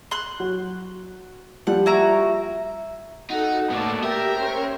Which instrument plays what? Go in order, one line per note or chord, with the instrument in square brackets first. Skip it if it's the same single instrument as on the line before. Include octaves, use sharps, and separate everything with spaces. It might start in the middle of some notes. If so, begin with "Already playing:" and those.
[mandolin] C6 F#6 G6
[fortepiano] F#3
[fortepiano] F3 G3 [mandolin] F#5
[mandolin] E4 F#4 A#5
[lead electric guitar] D#4 [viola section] F#4 A4 [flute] F#5
[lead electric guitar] A2 [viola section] A#3 A5 [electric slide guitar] B3 F#4 D5
[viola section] G4 [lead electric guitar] A#4 [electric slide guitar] E5 [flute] G5
[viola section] C#4 C5 C#5